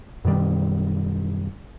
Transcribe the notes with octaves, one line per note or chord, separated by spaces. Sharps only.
F#2 B2 D#3 G3